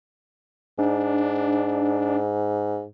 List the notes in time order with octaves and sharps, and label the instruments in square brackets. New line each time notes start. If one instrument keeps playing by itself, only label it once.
[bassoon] G#2 [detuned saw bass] D4